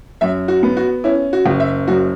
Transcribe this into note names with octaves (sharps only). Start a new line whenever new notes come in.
F#2 E5
F#4
B3
F#4
C#4 E4
F#4
F#1
E5
F#2 F#4